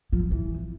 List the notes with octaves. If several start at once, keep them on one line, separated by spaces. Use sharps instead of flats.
F3
E3